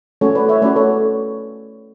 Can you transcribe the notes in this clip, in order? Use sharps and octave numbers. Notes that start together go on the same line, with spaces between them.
A3 C#4 F#4 A4 C#5
B4 D5
C#5 E5
A3 C#4 F#4 B4 D5
A4 C#5